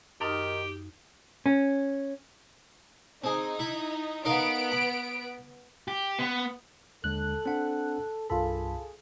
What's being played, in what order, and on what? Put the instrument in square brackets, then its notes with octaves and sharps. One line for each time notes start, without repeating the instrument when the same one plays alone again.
[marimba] F#2 D#4 F6 [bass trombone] D#3 [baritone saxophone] G4
[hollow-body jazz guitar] C#4
[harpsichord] C4 G#4 [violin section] D#4
[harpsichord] E4
[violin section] B3 D7 [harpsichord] D#4 A#4 F5
[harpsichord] B5
[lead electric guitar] G4
B3
[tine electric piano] D#2 D3 G#3 [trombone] A4 [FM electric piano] F#6
[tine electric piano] C4 D4 F#5
[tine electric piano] C2 G2 B5 [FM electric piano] F4 A4 [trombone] G#4